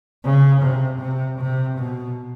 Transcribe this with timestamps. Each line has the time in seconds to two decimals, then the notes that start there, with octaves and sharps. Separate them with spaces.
0.24 C#3
0.61 C3
1.00 C3
1.39 C3
1.77 B2